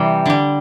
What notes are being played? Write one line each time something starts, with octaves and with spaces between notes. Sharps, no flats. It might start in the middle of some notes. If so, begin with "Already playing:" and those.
Already playing: C3 E3 G3
D3 G3